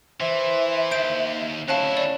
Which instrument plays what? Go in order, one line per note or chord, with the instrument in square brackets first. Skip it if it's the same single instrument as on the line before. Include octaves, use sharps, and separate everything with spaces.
[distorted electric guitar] E3 [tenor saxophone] C5 [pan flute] E5
[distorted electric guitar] D#2 [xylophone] G6 D7
[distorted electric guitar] D2 E4 [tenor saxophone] C#4 [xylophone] F5 A5 F#6
[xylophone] D5